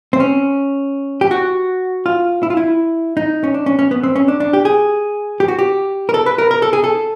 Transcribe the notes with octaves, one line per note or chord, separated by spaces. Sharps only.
C4
C#4
G4
F#4
F4
E4
F4
E4
D#4
C#4
D4
C#4
C#4
B3
C4
C#4
D4
D4
G4
G#4
G4
F#4
G4
A#4
A4
B4
A#4
A#4
A4
G#4
A4